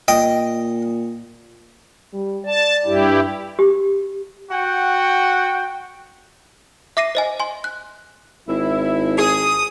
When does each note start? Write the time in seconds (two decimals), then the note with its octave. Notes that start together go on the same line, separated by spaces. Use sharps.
0.08 A#2 D#5 G5
2.13 G3
2.46 D5 A5
2.85 G2 E4 G4
3.59 G4
4.50 F#4 F#5 G5
6.97 E5 D6 A#6 C7 D#7
7.15 C5 D#5 G#5
7.40 G#5 C6
7.64 F#6
8.48 G#1 E4
9.18 G#4 D#6